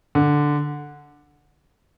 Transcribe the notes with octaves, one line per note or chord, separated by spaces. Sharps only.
D3